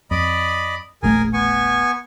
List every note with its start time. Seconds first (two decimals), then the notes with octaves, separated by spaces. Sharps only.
0.11 F2 D5 D#5 B5
1.03 E1 A#1 A3 G#4 A#4 G#5
1.33 B3 G#5 C#6